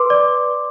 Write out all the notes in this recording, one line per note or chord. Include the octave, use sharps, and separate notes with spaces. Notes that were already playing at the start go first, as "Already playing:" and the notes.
Already playing: B4 C6 D6
D5